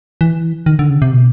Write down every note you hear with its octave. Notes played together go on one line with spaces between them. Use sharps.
E3
D#3
D3
C#3
C3
B2